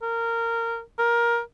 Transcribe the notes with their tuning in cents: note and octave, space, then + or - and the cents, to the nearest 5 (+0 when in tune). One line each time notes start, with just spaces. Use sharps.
A#4 -15
A#4 +15